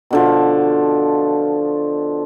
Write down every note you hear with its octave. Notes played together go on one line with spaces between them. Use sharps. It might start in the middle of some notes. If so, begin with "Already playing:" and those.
B2 D3 F3